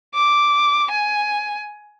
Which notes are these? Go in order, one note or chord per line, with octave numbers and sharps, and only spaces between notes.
D6
G#5